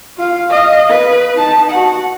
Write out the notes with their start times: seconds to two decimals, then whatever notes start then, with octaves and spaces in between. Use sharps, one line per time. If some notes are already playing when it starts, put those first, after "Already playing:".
0.17 F4 F5
0.50 D#5 F5
0.89 B4
1.34 D#4 A5
1.71 F#4 F#5